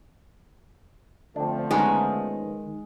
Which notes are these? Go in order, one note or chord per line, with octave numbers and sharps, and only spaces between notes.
D3 F3 A3 C4 D4
D#3 G#3 B3 C#4 A#4